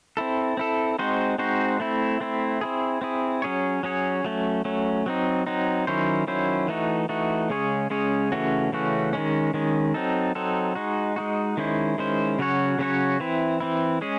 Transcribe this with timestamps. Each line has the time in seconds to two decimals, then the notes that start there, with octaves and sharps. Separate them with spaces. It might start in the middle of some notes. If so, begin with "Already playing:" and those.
0.17 C4 E4 A4
0.57 C4 E4 A4
0.99 G#3 C4 D#4 F#4 C5
1.38 G#3 C4 D#4 F#4 C5
1.80 A3 C4 E4
2.20 A3 C4 E4
2.61 C4 E4 G#4
3.02 C4 E4 G#4
3.42 F#3 C#4 G#4 C#5
3.83 F#3 C#4 G#4 C#5
4.24 F#3 A3 C#4
4.65 F#3 A3 C#4
5.06 F#3 C4 D#4
5.47 F#3 C4 D#4
5.87 D#3 F#3 C#4 E4 C5
6.27 D#3 F#3 C#4 E4 C5
6.68 E3 A3 D#4 F#4
7.09 E3 A3 D#4 F#4
7.50 C#3 G#3 C#4 G#4 C#5
7.90 C#3 G#3 C#4 G#4 C#5
8.32 C#3 E3 A3 C#4 F#4
8.72 C#3 E3 A3 C#4 F#4
9.13 D#3 G#3 C#4
9.54 D#3 G#3 C#4
9.94 F#3 C4 D#4 A4
10.35 F#3 C4 D#4 A4
10.75 G#3 D#4 F#4
11.16 G#3 D#4 F#4
11.57 D#3 G#3 C#4 E4 C5
11.98 D#3 G#3 C#4 E4 C5
12.39 C#3 F#3 C#4 F#4 C#5
12.79 C#3 F#3 C#4 F#4 C#5
13.20 E3 C4 E4
13.60 E3 C4 E4
14.01 G#3 C#4 G#4